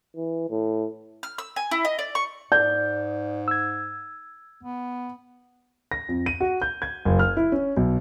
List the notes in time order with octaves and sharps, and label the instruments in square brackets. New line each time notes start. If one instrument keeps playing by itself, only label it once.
[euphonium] E3
A2
[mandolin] F6
E6
G#5
E4
D#5
D5
C#6
[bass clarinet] G#2 [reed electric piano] D5 [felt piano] G6
[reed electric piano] E6 G#6
[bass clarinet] B3
[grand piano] A#6
F2
D#7
F#4
G6
G#6
F#1
F6
E4
C#4
B1